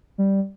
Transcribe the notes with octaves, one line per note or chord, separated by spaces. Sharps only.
G3